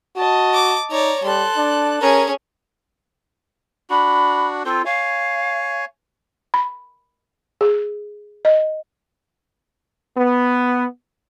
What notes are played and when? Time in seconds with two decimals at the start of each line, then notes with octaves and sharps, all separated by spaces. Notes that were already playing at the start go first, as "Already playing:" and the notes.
0.16 F#4 D#5 A5
0.53 D6
0.90 D#4 C#5 D5 A#5
1.23 G3 A4 C6 F#6
1.57 D4
2.01 C#4 G#4 A#4
3.90 D4 F#4 B5
4.65 C4 F4 A4 C5
4.86 C#5 F5 G#5
6.54 B5
7.61 G#4
8.45 D#5
10.18 B3